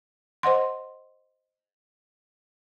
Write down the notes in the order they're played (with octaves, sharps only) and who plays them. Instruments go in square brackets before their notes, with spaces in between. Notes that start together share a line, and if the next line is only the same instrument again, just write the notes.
[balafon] C5 D#5 F#5 C6